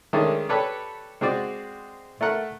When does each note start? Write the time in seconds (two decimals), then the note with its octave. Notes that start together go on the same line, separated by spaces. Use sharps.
0.13 D#3 G#3 A3 C#4 D4
0.49 G4 A4 B4 C#5 D5
1.21 G#3 C4 F#4 D5
2.21 A3 A#4 F#5